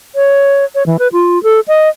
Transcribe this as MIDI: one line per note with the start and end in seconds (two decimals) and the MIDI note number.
0.15 0.65 73
0.75 0.83 73
0.86 0.97 52
0.99 1.08 71
1.13 1.42 65
1.43 1.60 69
1.68 1.89 75